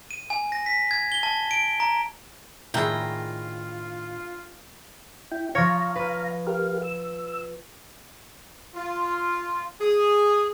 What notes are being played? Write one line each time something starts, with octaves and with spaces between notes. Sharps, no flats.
D#7
G#5
A#6
B6
G#6
G7
A5
D7
A#5
A2 D#3 D4 E4 F4 G#4 G5 A#5
E4 G5
F3 C#5 F5 A#5
B4
G4 A#4 F5
E6
F4
G#4